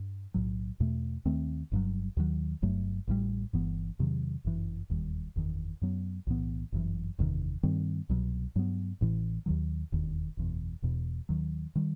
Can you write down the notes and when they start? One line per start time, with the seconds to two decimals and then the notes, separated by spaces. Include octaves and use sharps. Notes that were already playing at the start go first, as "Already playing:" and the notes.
Already playing: G2
0.34 B1 A2 F#3
0.80 E2 B2 A3
1.25 D#2 D#3 A3 C4
1.72 G1 G2 F#3
2.17 D#2 D#3 F#3
2.62 G1 G2 F#3 A3
3.07 A1 A2 E3 G3
3.53 G1 G2 E3 B3
3.99 E2 C3 D#3 F#3
4.44 G1 F#2 E3
4.90 E1 D#2 D#3 G3
5.36 F#1 E2 D#3
5.82 F#2 F#3 B3
6.27 B1 A2 E3 B3
6.72 G1 F#2 E3
7.19 F#1 E2 C3 D#3
7.63 G2 D#3 G3 C4
8.09 C2 B2 F#3
8.56 G2 F#3 B3
9.01 A1 A2 E3
9.46 D#2 D#3 F#3
9.92 E1 D#2 D#3
10.37 F#1 E2 B2
10.82 E1 E2 B2
11.29 D#2 D#3 F#3
11.75 D#3 G3